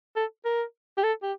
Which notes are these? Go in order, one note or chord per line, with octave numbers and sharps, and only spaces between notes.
A4
A#4
G4
A4
G4